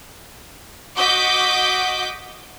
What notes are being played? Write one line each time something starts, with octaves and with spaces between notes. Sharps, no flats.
F#4 D#5 F#5 D6 G6 B6